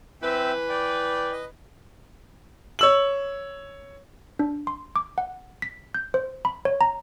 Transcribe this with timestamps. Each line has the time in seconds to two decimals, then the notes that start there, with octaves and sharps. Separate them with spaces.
0.22 E3 C4 B4 E5 G5
0.69 D5 G5
1.32 D#5
2.79 C#5 E6 F#7
4.39 D4
4.67 C6
4.96 D6
5.18 F#5
5.62 B6
5.94 G6
6.14 C5
6.45 B5
6.65 C#5
6.81 A#5